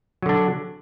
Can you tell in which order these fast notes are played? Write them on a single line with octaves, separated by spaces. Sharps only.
F#3 D3 D4